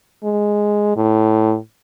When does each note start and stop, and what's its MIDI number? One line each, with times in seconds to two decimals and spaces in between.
0.24 0.94 56
0.96 1.57 45